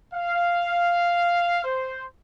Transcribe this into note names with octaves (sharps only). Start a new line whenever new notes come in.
F5
C5